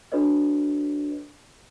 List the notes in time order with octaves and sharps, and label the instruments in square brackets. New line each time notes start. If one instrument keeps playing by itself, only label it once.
[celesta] D4 F#4 A4 B4 C#5 D#5